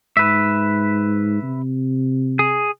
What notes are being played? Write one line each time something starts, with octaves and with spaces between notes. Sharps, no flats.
G#2 B4 E5
C3
G#4